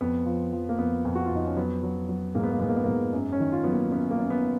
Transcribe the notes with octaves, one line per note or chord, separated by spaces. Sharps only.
F2 B3
F3
F3
A#3
F2 B3
F2
F#4
F2 F4
D#4
C#4
F#3 B3
F#3
F#3
G#2 A#3
B3
A#3
G#2 B3
A#3
B3
A#3
G#2
F#2
C#4
D#3
F4
F#3 B3
A#3
F#2 B3
A#3
F#2
B3